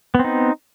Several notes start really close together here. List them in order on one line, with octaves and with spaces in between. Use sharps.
B3 C4 D#4